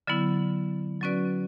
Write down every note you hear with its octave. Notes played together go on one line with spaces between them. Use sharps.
D3 F#3 B3 E4
F#3 C#4 F#4 B4 D5